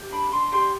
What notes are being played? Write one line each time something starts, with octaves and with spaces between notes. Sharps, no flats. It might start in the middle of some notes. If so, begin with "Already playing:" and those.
Already playing: G4
D4 B5
D4 C6
G4 C6